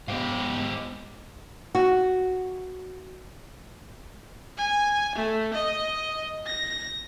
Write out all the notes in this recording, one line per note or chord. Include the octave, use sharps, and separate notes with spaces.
G#2 B3 G4 C5 F5
F#4
G#5
A3
D#5
A#6